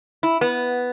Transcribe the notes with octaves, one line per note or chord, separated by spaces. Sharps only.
E4
B3